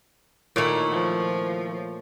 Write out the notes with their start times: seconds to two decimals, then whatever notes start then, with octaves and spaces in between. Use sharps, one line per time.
0.56 A#2 D#3 A3 E4 C#5
0.91 F3